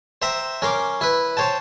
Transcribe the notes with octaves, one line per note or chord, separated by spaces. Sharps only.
C5 E5 G5 A#5
C#4 A#4 C6 D6
E4 B4
C5 C#5 G5 A5